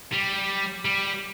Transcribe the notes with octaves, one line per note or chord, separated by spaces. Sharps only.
G3
G3